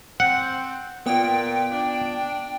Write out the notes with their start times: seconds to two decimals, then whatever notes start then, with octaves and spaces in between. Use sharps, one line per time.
0.20 C4 F#5
1.06 A#2 B3 F4 G5
1.72 D4